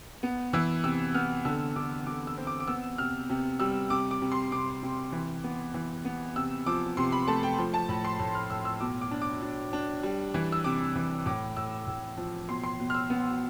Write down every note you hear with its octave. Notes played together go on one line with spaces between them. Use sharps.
B3
E3 E6
C3 E6
B3 F6
D3 E6
D3 D6
D3 D6
E6
C4
D6
D6
B3 E6
C3 F6
C3
G3 E6
C3 D6
D6
C3
C6
C3 D6
C3
E3
B3
E3
B3
C3 E6
F3 D6
C3 C6
B5
A3 A5
G5
F3
A5
A2 B5
C6
A2
F6
A2 E6
E6
B2 D6
D6
D4
D6
D4
D4
G3
E3
E6
C3 D6
E3
A2 D6
A2 E6
A2
F3
B2 C6
C6
B2
F6
E6
B3